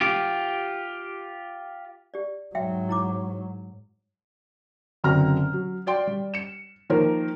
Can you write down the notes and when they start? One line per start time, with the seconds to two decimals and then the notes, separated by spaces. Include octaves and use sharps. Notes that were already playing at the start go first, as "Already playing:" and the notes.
0.01 F4 G4
2.14 G4 D5
2.55 G#2 F#3 E5 G5 C6
2.89 E4 A#5 D6
5.04 F#1 D3 F#3 C4 A#5 F6
5.53 F#3
5.86 F#4 D5 G5 C6
6.07 G3
6.34 C#7 E7
6.90 D#3 F3 A#3 A#4 C5